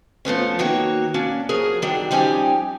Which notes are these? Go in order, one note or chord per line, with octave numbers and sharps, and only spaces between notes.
F3 A3 B3 C#4
D#3 A#3 F#4 C#5
A#3 C#4 D4
F3 F#3 G#4 A#4
D3 D#3 F#3 G3 D4
F3 G3 C#4 D#4 G4 G#5